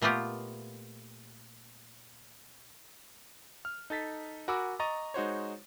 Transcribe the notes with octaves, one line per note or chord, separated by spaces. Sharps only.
A#2 A3 B3 F4 G4
F6
D#4 A4 A6 B6
F#4 A#4 G#5 B5 D6 E6
D#5 A#5 C#6 A6 D#7
G#3 D#4 F#4 C5 C#5